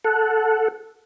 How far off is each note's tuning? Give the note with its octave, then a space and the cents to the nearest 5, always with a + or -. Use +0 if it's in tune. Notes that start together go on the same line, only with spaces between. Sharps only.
A4 +0 F#5 -10